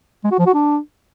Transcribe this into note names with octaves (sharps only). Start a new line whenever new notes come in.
G#3
F#4
F3
F#4
D4